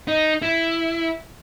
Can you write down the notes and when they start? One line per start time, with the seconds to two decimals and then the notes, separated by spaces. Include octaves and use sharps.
0.08 D#4
0.42 E4